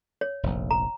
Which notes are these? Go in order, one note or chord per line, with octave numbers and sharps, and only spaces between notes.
C#5
F1 A#1
A#5